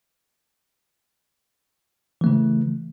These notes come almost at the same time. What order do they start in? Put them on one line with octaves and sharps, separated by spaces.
E3 A3 C#3